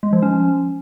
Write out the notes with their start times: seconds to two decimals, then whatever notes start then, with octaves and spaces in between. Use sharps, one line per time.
0.03 G#3
0.13 F3
0.22 C#4